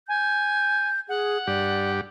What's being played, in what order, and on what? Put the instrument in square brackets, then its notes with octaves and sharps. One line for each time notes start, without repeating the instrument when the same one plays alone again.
[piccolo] G#5 [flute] G6
[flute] G#4 [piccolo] F#5
[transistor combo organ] G2 G4 [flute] D5